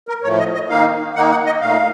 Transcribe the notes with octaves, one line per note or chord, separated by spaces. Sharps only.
A#4
A2 F3 A3 C#5
D#5
D#5
D#3 A#3 D#4 F5
D#3 A#3 D#4 F#5
F#5
D#5
A#2 A3 D#4 F5